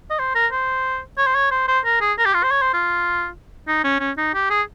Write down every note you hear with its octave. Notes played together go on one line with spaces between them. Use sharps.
D#5
C5
A#4
C5
C#5
C5
C#5
C5
C5
A#4
G#4
A#4
G4
F4
C5
C#5
C5
F4
D#4
C#4
C#4
D#4
G4
G#4